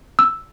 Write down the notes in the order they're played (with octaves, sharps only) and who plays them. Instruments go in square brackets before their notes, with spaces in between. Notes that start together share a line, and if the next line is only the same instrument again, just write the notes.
[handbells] E6